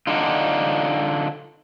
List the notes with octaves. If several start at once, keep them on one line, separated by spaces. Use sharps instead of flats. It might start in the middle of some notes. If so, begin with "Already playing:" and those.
D3 D4 D#4 F4